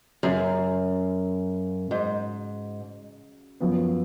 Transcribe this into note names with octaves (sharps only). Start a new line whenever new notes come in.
F#2 C#3 F#3 C#4 F#4
G#2
F#2 F3 B3